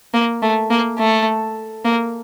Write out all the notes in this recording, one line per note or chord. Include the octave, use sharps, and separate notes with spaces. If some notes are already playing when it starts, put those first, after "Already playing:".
A#3
A3
A#3
A3
A#3